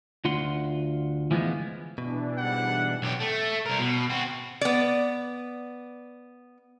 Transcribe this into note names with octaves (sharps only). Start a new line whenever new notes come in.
D2 F4 F#5 C6
E3 F3 G#3 B3
B2 E3 D4
G#2 G3 F#5
B1 G4
A3
C2 A#4
B2
C4 F#4
B3 D5